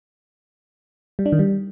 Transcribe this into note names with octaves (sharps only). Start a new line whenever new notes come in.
G3
D4
D#3
G3